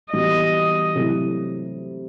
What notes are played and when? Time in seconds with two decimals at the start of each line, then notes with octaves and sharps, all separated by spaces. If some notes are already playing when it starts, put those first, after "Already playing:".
0.13 E3 G3 B3 F#4 D#5
0.95 C3 F#3 A3 E4